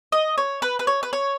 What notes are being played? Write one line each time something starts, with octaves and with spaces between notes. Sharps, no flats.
D#5
C#5
B4
B4
C#5
B4
C#5